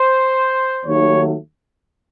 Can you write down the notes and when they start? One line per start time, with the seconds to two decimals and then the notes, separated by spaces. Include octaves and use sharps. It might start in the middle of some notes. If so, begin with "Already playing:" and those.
Already playing: C5
0.85 D#2 D#3 F#3 A3 C#5